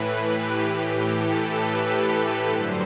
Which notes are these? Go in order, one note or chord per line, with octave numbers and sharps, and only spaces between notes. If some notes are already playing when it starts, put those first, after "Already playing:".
Already playing: A2 E3 B4
G4
A2 E3 G4
A4
B4
G2 D3 F#3 C5